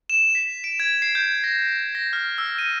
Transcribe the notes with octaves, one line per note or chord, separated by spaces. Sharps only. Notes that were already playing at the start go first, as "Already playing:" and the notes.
E7
B6
D7
G#6
C7
G6
A#6
A#6
F6
E6
D#7